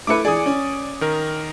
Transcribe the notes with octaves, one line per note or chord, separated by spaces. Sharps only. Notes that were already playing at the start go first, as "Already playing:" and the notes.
A3 E4 B4 D6 C#7
E3 G#4 D5 D#6
C#4
D#3 A#4